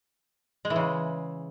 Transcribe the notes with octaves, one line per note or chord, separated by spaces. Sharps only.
G#3
E3
C#3